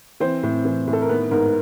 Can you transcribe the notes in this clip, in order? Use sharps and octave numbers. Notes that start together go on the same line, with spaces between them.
E3 C4 C5
A2
E3
A2
A4
A#4
D#3 B3 B4
G#2 A#4